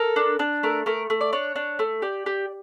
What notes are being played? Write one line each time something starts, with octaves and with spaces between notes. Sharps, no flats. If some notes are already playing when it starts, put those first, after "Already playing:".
Already playing: A4 A#4
D4
D4
A3 A#4
A3 A#4
A3
D5
D4 C#5
D4
A3
G4 D5
G4